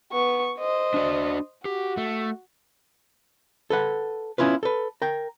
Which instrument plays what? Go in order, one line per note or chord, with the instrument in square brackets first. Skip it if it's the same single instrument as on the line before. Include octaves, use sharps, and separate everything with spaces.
[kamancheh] B3 C#6
C5 D#5
[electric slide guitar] D4 F#4 D5
[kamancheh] F#4 [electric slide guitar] G4
[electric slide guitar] A3
[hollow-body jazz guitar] A4 B4 F#5
B3 C#4 E4 F4 B4
A4 B4
A#4 G5